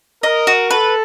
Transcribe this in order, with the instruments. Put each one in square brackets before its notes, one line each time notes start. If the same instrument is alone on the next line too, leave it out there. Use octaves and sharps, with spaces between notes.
[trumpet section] A#4 [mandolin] D#5
[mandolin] F#4
[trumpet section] A4 [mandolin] B4